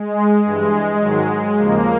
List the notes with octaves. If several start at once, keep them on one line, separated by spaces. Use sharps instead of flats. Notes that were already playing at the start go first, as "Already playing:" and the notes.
Already playing: G#3
G2 E3 G#3
G#2 D#3 F#3
D#2 C#3 F3 A#3